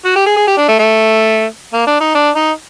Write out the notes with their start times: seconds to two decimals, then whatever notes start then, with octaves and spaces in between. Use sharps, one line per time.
0.05 F#4
0.16 G4
0.26 G#4
0.37 G#4
0.47 G4
0.58 D4
0.68 A3
0.79 A3
1.73 A#3
1.87 D4
2.01 D#4
2.15 D4
2.36 D#4